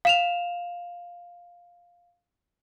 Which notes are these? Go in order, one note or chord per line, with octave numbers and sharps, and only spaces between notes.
F5 E7 F7